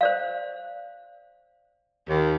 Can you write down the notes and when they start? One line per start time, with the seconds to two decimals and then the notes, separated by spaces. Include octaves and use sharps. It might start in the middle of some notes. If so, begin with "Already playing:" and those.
0.01 C5 D5 F5
2.09 D#2